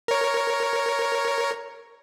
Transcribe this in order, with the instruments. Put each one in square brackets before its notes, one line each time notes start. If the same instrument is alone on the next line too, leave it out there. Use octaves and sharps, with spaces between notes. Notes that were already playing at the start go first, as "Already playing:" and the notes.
[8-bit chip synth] A#4 C#5